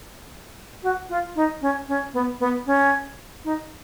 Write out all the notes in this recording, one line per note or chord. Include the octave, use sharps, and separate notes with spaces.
F#4
F4
D#4
C#4
C#4
B3
B3
C#4
D#4